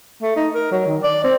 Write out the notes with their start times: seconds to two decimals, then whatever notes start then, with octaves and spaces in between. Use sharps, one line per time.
0.22 A3
0.36 D#4
0.54 A#4
0.71 F#3
0.87 D#3
1.03 D5
1.24 C4